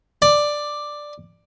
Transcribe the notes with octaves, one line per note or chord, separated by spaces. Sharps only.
D5